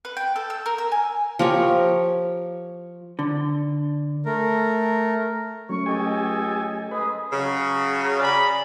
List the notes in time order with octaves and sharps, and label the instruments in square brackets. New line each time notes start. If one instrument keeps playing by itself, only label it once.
[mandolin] B4
G5
A4
E6
A#4
E6
G#5
[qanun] F3 G4 A#4 C#5
[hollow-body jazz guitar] D3
[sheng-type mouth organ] A3 A#4
[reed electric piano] F#3 A3 C#4 [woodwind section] C#6
[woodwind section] C#2 A4 D#5 [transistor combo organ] G4 G#5
[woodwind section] G#3 G#4 D#6 [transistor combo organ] B4
[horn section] C#3 F#3
G#4 D5 A#5 B5